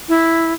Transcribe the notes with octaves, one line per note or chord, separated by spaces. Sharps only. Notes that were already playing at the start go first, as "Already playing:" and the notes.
E4